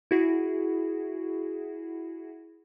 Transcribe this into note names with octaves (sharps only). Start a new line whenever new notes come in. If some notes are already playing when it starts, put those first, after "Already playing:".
E4 F#4 G#4